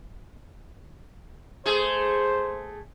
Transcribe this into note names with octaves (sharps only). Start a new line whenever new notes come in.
A3 G#4 C5